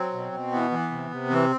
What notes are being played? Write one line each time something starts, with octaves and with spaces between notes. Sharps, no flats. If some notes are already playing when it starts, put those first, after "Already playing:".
Already playing: F#3 C4
B2
B2
E3 B3
E3
C3
C3
E3 C4